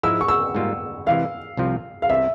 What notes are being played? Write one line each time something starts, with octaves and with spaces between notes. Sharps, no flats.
G#2 F3 G#3 E4 E6
C#6
E6
G#2 G3 A#3 F4
C3 E3 G#3 F5
C2 C3 F3 C4 F4
F5
C2 C3 G3 E5